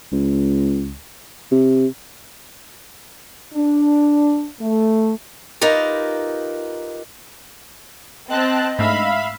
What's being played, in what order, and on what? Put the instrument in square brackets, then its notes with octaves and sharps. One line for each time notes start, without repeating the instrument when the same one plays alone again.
[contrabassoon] C#2
C3
[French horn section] D4
A3
[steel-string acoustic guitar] D#4 F4 G4 A#4 B4
[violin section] C4 [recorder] D#5 [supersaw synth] A5 F#6
[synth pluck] G#2 A3 D4 [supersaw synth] E5 F5 [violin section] B5